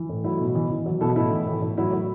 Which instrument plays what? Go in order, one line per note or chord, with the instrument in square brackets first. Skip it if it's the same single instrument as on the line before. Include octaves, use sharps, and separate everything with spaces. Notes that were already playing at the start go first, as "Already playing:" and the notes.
Already playing: [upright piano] E3
A2
F#3 E4
B2
E3
E3
F#3
B2 E4 A4
A2 E4
E3
A2
A2
F#3 E4
F#3